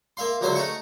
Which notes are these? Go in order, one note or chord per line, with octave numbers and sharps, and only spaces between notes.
A#3 E5 F5 C6
C#2 D3 F#3 C5 E5 C6
A3 D#4 F#4 A4 C#6